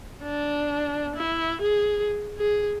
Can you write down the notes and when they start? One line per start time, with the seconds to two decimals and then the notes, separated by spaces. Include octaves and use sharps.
0.23 D4
1.16 E4
1.62 G#4
2.38 G#4